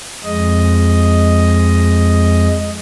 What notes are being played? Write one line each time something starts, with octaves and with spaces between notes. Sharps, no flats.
F2 G#3 D#5